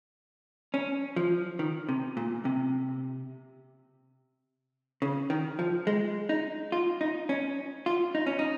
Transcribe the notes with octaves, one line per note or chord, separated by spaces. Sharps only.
C#4
F3
D#3
C3
A#2
C3
C#3
D#3
F3
G#3
D#4
F4
D#4
C#4
F4
D#4
C#4
D#4